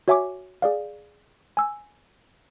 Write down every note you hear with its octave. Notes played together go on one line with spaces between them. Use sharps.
F#4 C#5 E5 G#5 C#6 D6
G#4 D5 F5
G#5 E6